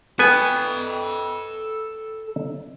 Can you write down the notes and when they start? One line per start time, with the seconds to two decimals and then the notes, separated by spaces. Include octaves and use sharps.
0.19 B3 A4 G5 G#5